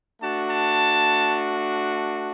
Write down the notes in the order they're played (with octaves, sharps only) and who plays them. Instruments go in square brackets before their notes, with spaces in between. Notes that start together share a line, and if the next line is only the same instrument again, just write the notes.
[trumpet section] A3 D4 F#4 A5
A5